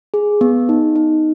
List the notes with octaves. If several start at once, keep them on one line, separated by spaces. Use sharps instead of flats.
G#4
B3
D#4
D#4